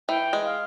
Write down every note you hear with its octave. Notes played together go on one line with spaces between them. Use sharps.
E3 G5
G#3
F5